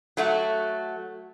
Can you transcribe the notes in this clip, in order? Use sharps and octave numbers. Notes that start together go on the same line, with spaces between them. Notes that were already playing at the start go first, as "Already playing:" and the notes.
F#3 A3 F#4